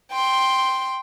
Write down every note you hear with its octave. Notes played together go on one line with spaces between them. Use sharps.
G5 C6